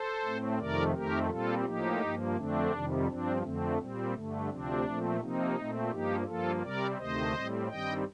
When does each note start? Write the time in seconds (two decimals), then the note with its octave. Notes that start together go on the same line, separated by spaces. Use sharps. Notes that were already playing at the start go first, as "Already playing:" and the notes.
Already playing: A4 C5
0.24 A2 A3 C4
0.59 F2 C3 D#3 A3 A#4 D5
0.94 F2 D#3 A3 C4 G4 A#4
1.29 A#2 G3 C4 F4 A4
1.65 A2 F3 A#3 D#4 G4
2.01 G2 F3 A#3
2.36 F2 D3 A3 C4 D4
2.72 F2 C3 D#3 G3
3.07 G2 F3 C4 D4
3.42 F2 D3 A3 C4
3.78 A#2 G3 C4
4.14 G2 D3 A3
4.49 D2 C3 F3 C4 D4
4.85 A#2 F3 A3 C4
5.20 C3 F3 A#3 C4 D#4
5.56 A#2 A3 C4
5.91 G2 F3 A#3 D#4 G4
6.27 G2 F3 A#3 F4 A4
6.62 C3 G3 C4 A#4 D5
6.97 D2 C3 D#3 A3 C5 D#5
7.33 A2 G3 C4
7.69 G2 D#3 G3 C4 D#5 G5